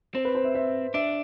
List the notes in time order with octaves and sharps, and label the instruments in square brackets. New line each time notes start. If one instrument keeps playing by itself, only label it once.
[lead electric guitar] C4 [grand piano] C5
[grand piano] B4
C5
E5
E5
[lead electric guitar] D4 [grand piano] E5